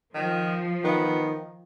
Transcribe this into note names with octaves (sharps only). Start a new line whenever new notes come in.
D#3 F3
D#3 B3